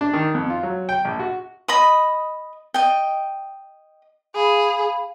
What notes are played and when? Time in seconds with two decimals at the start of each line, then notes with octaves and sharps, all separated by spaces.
0.01 D4
0.13 D#3
0.34 F2
0.50 F4
0.63 F#3
0.89 G5
1.05 A#1
1.20 F#4
1.68 D#5 B5 D#6
2.74 D#5 G5
4.36 G#4 F5 B5